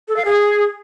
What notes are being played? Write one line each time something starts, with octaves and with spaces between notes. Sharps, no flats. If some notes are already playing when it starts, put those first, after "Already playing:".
A4
F5
G#4